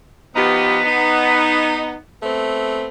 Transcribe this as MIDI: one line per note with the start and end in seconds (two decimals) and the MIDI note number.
0.36 0.78 53
0.36 1.95 59
0.36 0.78 63
0.36 0.78 67
0.85 1.99 63
2.22 2.88 57
2.22 2.88 59
2.22 2.88 60